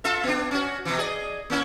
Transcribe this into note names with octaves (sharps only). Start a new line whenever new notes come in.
F4 A4 E5
B3 D4
C#4 F#4
B2 E3
G#4 D5 D#5
A#3 C#4 E4